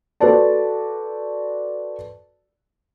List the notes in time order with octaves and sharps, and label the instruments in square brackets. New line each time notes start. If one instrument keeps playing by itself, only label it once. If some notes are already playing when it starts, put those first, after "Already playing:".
[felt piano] F#4 A4 B4 C5 D5 A5